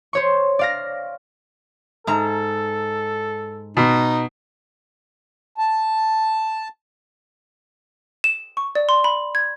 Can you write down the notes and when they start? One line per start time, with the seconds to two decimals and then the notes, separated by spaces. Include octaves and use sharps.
0.13 C5 C#5 C#6
0.59 D5 F5 A#6
2.07 G#2 A4 A#5
3.77 B2 D#4
5.58 A5
8.24 E7
8.57 C#6
8.75 D5
8.89 C6
9.04 B5
9.35 G#6